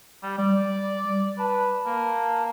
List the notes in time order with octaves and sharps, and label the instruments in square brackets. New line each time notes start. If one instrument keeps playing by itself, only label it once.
[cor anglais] G3
[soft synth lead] G3 [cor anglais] D5
[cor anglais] B4 [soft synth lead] A5
[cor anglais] A#3